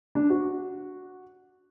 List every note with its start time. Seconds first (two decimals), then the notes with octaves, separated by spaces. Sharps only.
0.15 D4
0.30 F#4